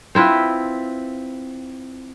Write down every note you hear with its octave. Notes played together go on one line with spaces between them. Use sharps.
C4 E4 F4 B4